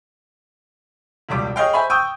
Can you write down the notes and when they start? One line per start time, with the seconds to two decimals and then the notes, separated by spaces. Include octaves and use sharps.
1.29 E1 C#2 G3 D6
1.56 G#4 C#5 D#5 F5 G5
1.73 C5 E5 G#5 B5 C#6
1.90 G5 C#6 D#6 E6 G6 D#7